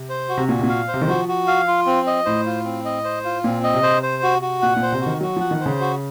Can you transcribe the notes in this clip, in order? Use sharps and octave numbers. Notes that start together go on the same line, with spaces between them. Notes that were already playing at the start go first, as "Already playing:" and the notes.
Already playing: C3
C5
F#4
C3
A#2 F#4
C3
A#2
F5
C5
C3
D#3
F3 F#4
F#4
F5
F4
C4
D#5
A2 C5
F4
C4
D#5
C5
F4
A#2 C4
D#5
C3
C5
C5
F#4
F#4
A#2 F#5
A#2
C5
C3
F#4
D#3
F#3 F#4
F3 F#5
D#3
C5
C#3
F#4